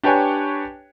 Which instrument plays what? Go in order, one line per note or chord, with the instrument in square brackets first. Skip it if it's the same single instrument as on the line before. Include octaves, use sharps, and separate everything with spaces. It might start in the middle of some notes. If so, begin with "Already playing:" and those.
[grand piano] D4 G4 B4 C#5 G5 G#5